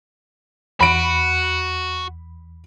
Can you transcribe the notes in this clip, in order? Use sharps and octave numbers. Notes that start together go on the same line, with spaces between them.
E2 F#4 B5 D7